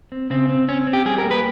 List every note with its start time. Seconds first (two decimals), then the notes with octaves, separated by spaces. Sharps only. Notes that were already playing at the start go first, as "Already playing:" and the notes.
0.12 C4
0.30 C#3 C4
0.49 C4
0.68 C4 C#4
0.87 C4
0.93 G4
1.05 G3 G#4
1.18 A#4
1.25 A#3
1.31 B4